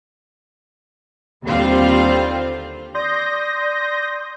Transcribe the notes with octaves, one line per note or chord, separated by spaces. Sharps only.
D#2 D3 G3 C4 F4 F5
D5 C6 D#6 G6 A#6